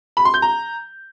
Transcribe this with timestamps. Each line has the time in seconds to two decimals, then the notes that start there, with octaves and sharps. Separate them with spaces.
0.17 B5
0.25 C6
0.34 G6
0.42 A#5